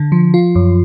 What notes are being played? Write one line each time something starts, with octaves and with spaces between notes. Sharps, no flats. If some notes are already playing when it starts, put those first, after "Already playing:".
Already playing: D3
F3
F4
F#2